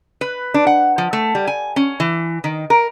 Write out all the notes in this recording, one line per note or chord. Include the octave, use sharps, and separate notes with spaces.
B4
D4
F#5
F3
A3
G3
G#5
C#4
E3
D#3
A#4